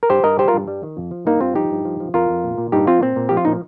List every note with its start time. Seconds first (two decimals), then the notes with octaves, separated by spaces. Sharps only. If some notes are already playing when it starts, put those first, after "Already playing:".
0.03 A#4
0.09 G2 G4 C5
0.23 G2 A#4 D#5
0.39 G3 G4 C5
0.48 F4 A#4
0.54 G2
0.68 G3
0.83 D#3
0.97 F2
1.11 F3
1.26 G2 A#3 D#4
1.40 G2 C4 F4
1.55 F3 D#4 G4
1.70 G2
1.85 F3
2.00 F3
2.14 F2 F4 A#4
2.29 F2
2.44 A#2
2.58 A#2
2.72 G2 D#4 G4
2.87 F3 C4 F4
3.02 A#2 C4
3.16 A#2
3.29 F3 G4
3.37 F4
3.45 A#2 D#4